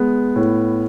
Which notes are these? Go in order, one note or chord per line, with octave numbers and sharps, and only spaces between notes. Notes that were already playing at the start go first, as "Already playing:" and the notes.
Already playing: G#3 B3
A2